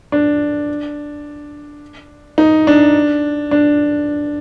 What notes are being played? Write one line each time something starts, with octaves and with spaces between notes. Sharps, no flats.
D4
D#4
D4
D4